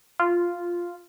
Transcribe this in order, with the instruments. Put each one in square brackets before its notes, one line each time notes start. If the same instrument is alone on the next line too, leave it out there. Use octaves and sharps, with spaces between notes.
[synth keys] F4